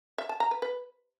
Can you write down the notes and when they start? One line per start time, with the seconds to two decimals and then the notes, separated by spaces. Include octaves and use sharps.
0.18 E5
0.29 A5
0.40 A#5
0.51 B4
0.62 B4